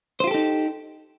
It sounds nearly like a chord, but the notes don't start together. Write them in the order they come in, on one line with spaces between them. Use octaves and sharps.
C5 F4 G4 A4 D#4